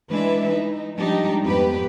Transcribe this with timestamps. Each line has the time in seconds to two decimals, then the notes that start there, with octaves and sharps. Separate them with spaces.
0.10 E3 G#3 D4 B4 E5
0.49 D#4
0.94 F3 G3 G#3 D4 D#4 G4
1.41 F2 G#2 B3 G4 B4